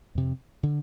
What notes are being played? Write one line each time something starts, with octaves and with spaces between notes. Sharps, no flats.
F2 C3
D3